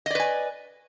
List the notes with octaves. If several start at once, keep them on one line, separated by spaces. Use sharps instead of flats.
B4 D5 D#5 G#5